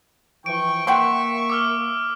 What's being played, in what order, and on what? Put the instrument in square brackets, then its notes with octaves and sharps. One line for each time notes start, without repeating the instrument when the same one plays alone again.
[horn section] E3 F3 [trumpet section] G5 C#6 [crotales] D7
[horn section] A#3 [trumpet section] E5 C#6 [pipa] F#5 G5 C6
[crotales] D6 E6 F6